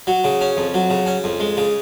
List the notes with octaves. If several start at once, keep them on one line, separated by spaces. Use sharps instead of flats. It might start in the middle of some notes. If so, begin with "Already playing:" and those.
F#3
C#3
C#4
F2
F#3
C#3
C#4
F2
G#3
C#3